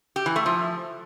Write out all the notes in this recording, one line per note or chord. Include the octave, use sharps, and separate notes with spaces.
G4
E3
A3
F3